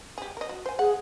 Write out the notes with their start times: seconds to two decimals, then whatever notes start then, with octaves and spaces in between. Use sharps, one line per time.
0.18 G4 G#4
0.37 A#4 D#5
0.49 F#4
0.66 C5 G#5
0.79 G#4 F#5